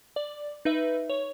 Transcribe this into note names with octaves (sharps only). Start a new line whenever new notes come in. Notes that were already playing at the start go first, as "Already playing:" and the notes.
D5
D#4 B4 E5
C#5